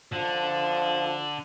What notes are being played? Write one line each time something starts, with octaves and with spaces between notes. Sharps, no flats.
D3 F3